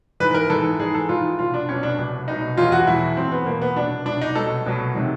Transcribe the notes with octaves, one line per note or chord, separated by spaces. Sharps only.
G#2 E3 B4
B4
A#4
G#2 E3 A4
G#2 E3 G#4
A4
G#2 E3 F4
C2 B2 F#3 F4
D4
C2 B2 F#3 C#4
D4
C2 B2 F#3
C2 B2 F#3 D#4
E2 B2 F#3 F4
F#4
E2 B2 F#3 E4
E2 B2 F#3 C4
B3
E2 B2 F#3 A#3
B3
C2 B2 F#3 D4
C2 B2 F#3 D4
D#4
C2 B2 F#3 A4
C2 B2 F#3
C3 D#3 F#3